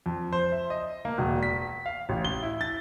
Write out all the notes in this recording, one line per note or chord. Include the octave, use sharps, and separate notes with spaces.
F2
C5
E5
D#5
A#3
E1
B6
F5
A1
G7
E4
A6